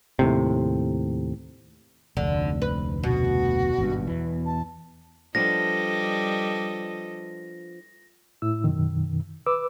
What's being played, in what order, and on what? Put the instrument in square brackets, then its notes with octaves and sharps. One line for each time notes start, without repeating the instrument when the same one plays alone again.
[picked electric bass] D#2 A2 C3
[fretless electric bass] F1 D2 [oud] D3
[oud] B4
[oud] B2 [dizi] F#4
[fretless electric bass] G#1 G2
E2 E3
[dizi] A5
[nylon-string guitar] F3 B3 D4 [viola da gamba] G3 A4 D#5 [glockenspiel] A#6
[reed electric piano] A2 E4 E6
F#2 B2 D#3
B4 D6 E6